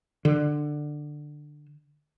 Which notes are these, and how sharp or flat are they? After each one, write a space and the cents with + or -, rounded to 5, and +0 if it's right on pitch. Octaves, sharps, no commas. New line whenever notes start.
D3 +15